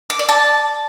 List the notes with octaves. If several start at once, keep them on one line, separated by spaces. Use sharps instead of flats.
D6
D5
A5